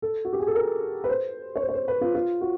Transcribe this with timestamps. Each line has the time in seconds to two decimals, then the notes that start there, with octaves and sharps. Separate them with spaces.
0.02 A4
0.25 F#4
0.33 G4
0.40 G#4
0.47 A4
0.55 A#4
1.04 B4
1.09 C5
1.56 C#5
1.62 C5
1.69 C#5
1.75 C5
1.88 B4
2.01 F4
2.15 F4
2.41 F#4